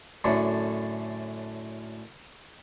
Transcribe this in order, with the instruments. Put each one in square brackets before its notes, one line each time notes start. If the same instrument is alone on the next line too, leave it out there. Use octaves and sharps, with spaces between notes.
[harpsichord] F#2 A2 D3